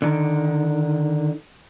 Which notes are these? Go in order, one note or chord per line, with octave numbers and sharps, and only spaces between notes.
D3 D#3